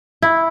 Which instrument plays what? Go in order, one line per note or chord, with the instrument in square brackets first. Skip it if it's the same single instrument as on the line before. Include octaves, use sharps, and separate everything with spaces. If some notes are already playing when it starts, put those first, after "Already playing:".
[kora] E4